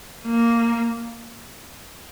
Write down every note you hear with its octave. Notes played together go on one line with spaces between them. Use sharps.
A#3